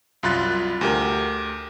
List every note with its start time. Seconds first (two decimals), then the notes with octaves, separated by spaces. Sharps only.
0.23 C2 F#2 F4 B5 F#6 A6
0.81 D2 G4 A#4